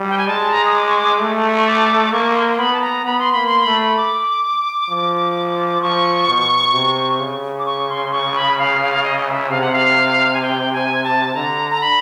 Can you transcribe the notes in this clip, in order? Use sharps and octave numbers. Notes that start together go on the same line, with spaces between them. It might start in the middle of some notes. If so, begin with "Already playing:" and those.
Already playing: G3
G5
G#5
G#3 A5
A#5
D#6
D6
C#6
D6
A3
C#6
D6
A#3 C#6
C#6
C6
C6
B3 B5
A5
A#5
B3 B5
C6
A#3 B5
C6
B5
A3
D6
F3
F3 C#6
B2
C3
C#3
D6
C#6
C6
C#6
B5
F5
F5
D#5
E5
C3 F5
F#5
F5
G#5
G5
G#5
A5
D3 A#5
A#5
B5